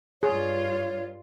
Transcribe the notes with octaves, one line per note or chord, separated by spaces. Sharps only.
G2 F4 G#4 C#5